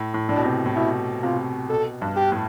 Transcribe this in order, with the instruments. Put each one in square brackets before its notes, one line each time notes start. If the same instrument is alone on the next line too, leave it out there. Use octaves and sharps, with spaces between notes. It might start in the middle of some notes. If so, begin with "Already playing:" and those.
Already playing: [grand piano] A2
A2
[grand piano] A2 [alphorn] D4
[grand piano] B2
C3
A2
[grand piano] B2 [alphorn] E4
[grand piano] C3 [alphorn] F4
[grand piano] B2 [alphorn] A4
[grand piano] G2
[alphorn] G4
[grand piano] A2